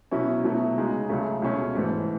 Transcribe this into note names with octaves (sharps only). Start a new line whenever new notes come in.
B2 F#3 C#4 E4
B2 F#3 A3 E4
C#3 G#3 D#4
C#2 C#3 F#3 A3
C#2 B2 A3 C#4
G#2 E3 A3